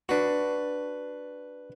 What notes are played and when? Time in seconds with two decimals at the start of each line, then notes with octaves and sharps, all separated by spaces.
0.09 D4 F#4 B4